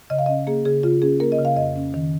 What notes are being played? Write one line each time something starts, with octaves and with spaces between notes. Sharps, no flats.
C#3 D#5
F5
C#4 D#5
A#3 G#4
C#3 G#4
C#3 F4
C#4 G#4
A#3 A#4
D#5
C#3
F5
F2 D#5
C#4
D#3